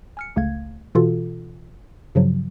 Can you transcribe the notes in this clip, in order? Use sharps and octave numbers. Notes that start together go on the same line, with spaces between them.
G#5 F6 C#7
G1 C#2 C#3 A3 F5 G#6
B2 E3 F4 F#4 A4
G2 C#3 F3 F#3